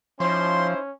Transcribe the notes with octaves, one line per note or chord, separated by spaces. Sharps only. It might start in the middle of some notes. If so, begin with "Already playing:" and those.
F3 C#4 D#4 E4 C5 C6